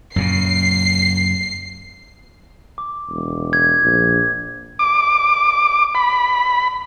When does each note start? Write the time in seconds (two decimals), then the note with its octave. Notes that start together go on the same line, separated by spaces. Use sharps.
0.16 F#2 A#2 C#3 C7
2.78 D6
3.10 E1
3.53 G#6
3.82 A#1
4.79 D6
5.95 B5